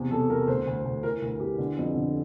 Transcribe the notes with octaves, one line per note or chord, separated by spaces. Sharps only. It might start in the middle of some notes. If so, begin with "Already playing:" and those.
Already playing: E2 C3
E2 A4
E2 A#4
D2 C5
D2
D2
E3 A#4
D2 A#4
E3 G4
D3
F2
D3